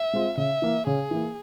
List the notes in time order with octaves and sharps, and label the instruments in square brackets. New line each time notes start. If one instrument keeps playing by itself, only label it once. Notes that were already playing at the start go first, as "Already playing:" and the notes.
Already playing: [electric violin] E5
[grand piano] G#3 C4 F4
[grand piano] C#3 [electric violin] E5
[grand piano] E3 A#3
[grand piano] C#3 [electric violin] G#4
[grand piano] E3 A#3